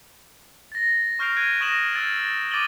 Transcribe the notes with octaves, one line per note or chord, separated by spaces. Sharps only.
A6 A#6
C#6 F6 G6 C7 D7 F7
F#6 G#6 D7 D#7
C#6 D#6 A#6 D7 E7 F#7
E6 F6 G#6 A6 D7
D6 A6 D7 D#7 F#7 G7